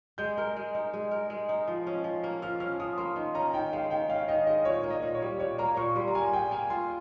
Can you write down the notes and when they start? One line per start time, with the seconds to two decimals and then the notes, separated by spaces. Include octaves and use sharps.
0.18 G#3 G6
0.38 A#4
0.56 G#3
0.75 D#4
0.94 G#3
1.11 A#4
1.30 G#3
1.49 D#4
1.68 F3
1.87 C#4
2.04 F3
2.24 A#3
2.42 F3 F6
2.60 C#4 F6
2.80 F3 D#6
2.97 A#3 C6
3.16 D#3
3.35 C#4 A#5
3.53 D#3 G5
3.73 G#3 F5
3.90 D#3 G5
4.10 C#4 F5
4.28 D#3 D#5
4.47 G#3 D#5
4.65 A#2 C#5
4.84 A#3
4.90 D#5
5.03 A#2
5.15 C#5
5.22 G3
5.39 A#2 C#5
5.58 A#3 A#5
5.77 A#2 C#6
5.96 G3 C6
6.08 A#5
6.14 A#3 G#5
6.33 G#4 G5
6.51 A#3 G#5
6.70 F4 C6